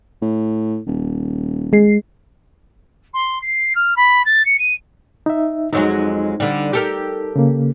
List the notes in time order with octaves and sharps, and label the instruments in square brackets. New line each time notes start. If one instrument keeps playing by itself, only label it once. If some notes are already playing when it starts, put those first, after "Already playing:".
[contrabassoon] A2
D#1
[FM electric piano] G#3 C7
[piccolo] C6
C7
F6
B5
A6
C#7
D#7
[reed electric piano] D#4 E5
[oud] F2 F#3 G#3 [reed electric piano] D#4
[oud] D3 G3
G4 A4 A#4
[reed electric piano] C#3 A#3